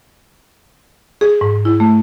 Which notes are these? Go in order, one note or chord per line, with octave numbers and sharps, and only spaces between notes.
G#4
G#2
E4
A3